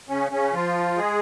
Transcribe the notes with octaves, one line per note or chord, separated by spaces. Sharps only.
C#3 C#4
C#3 C#4
F3 F4
G#3 G#4